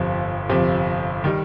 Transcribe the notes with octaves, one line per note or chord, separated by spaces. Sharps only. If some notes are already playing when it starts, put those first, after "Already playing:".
Already playing: G1 F2 C3 F3
G1 F2 C3 F3
D#3 G3